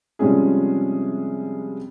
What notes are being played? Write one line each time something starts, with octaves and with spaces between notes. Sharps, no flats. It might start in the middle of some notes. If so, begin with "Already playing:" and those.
C3 F3 G3 G#3 C#4 G#4